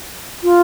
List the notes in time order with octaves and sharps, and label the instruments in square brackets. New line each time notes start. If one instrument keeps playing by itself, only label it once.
[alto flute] F4